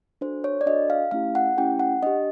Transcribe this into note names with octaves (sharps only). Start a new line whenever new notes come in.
D4 F#4 A4 C5
C#5
D5
D4 F#4 A4 D#5
F5
A3 C#4 E4 G4 F5
F#5
A3 C#4 E4 G4 G5
F#5
D4 G4 D#5